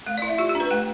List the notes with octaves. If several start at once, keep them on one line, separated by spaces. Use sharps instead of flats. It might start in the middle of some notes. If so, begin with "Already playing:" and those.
A3 F5
E4 D5
E5
F4 G4
G4
D4
B4
A3 G5